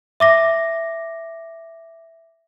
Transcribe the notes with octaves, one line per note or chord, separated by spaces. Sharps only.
E5 D6 A#6